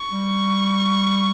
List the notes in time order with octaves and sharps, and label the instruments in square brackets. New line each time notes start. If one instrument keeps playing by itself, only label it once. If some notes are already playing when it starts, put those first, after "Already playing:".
Already playing: [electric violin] C#6
[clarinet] G3